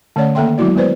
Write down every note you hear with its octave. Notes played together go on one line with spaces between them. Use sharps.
D3 A3 C#4 C#5 D5 F#5
D#3 A#3 A4 E5 G5 C6
F#3 G#3 B3 E4 F#4 D5
G#3 B3 B4 C5 D5